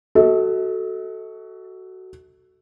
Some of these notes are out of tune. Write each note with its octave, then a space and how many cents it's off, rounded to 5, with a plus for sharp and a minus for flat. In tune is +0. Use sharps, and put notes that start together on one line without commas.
F#4 +15 A4 +0 D#5 +45